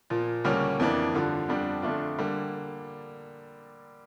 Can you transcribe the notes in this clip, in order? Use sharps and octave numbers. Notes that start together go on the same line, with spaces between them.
A#2 F3 A#3
D2 C#3 G3 A#3 C#4
F2 E3 A#3 D4
G2 D3 F3
F2 D3 G3 D4
F2 D3 A3 D4 F4
D3 G3 A#3